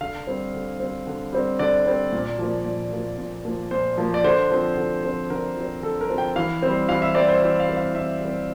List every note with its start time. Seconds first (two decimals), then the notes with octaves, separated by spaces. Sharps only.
0.01 D3 F5
0.27 G3 C4
0.54 D3
0.80 G3 C4
1.07 D3
1.33 G3 C4
1.59 D3 D5
1.86 G3 C4
2.12 A#2
2.39 F3 A#3
2.66 A#2
2.92 F3 A#3
3.18 A#2
3.45 F3 A#3
3.71 A#2 C5
3.98 F3 A#3
4.14 D5
4.24 D3 C5
4.51 F3 C4
4.77 D3
5.03 F3 C4
5.30 D3 A#4
5.56 F3 C4
5.83 D3 A4
6.01 A#4
6.10 F3 C4
6.18 G5
6.36 E3 F5
6.62 G3 C4
6.89 E3 F5
7.02 E5
7.15 G3 C4 D5
7.29 C5
7.42 E3 C5
7.60 F5
7.68 G3 C4
7.77 F5
7.95 E3 E5
8.21 G3 C4